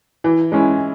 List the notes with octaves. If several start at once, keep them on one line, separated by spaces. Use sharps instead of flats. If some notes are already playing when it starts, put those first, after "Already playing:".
E3
G#3 C#4 E4